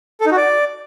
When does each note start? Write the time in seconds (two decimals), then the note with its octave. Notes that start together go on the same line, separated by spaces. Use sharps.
0.20 A4
0.26 D#4
0.31 F#4
0.37 D5